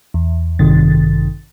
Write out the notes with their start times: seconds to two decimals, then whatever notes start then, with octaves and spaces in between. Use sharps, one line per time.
0.14 E2
0.59 A1 G2 C3 D#3 A6